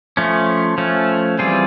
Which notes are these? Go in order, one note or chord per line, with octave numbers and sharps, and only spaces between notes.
F3 A3 C#4
F3 A3 C#4
E3 G3 C4 F4 G#4